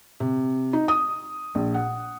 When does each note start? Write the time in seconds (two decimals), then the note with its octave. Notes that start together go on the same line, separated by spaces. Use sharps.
0.20 C3
0.73 D#4
0.88 D#6
1.55 A#1
1.74 F#5